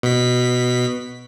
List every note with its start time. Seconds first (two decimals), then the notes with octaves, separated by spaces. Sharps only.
0.03 B2 B6